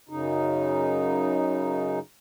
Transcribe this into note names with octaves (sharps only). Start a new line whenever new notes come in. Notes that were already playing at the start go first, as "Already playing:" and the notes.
F#2 C#3 D#4